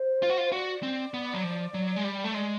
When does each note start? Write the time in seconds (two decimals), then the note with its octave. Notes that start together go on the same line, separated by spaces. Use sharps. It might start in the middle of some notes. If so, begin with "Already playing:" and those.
Already playing: C5
0.23 F4
0.30 F#4
0.38 F4
0.52 F#4 D5
0.83 C4
1.14 B3
1.33 F#3
1.43 F3
1.74 F#3
1.96 G#3
2.04 G3
2.24 A3
2.34 G#3 D5